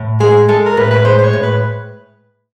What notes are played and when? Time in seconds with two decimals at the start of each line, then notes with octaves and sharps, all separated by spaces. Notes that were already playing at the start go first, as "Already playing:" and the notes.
Already playing: A2
0.20 G#3 G#4
0.48 G#3 A4
0.66 A#4
0.77 A2 B4
0.91 B4
1.04 G#3 C5
1.18 C5
1.24 C#5
1.33 A2
1.43 B4